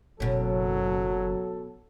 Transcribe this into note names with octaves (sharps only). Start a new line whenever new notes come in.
F#1 B2 F#3 C#4 A4